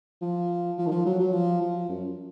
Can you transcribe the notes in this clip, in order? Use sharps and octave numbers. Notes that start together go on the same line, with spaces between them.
F3
F3
D#3
F3
F#3
F#3
F3
F3
F#2